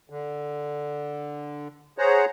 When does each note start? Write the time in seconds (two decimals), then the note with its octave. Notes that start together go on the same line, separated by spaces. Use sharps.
0.10 D3
1.98 G#4 C5 C#5 F#5 A#5